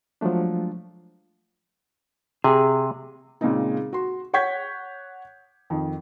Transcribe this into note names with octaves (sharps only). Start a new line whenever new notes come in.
F3 F#3 G#3 A3 D4
C3 G#4
A#2 C#3 G#3 C4 D#4
F#4 C6
C#5 F#5 C#6 G6 G#6 B6
F2 D#3